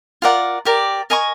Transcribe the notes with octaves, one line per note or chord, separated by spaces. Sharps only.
F4 A#4 D5 F#5
G4 A#4 D5
A#4 D#5 G#5 C#6